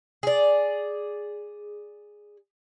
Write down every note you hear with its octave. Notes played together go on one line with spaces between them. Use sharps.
G#4 D5